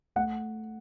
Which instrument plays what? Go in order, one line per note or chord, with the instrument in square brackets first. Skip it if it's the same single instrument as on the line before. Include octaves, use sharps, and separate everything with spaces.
[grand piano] A3 F#5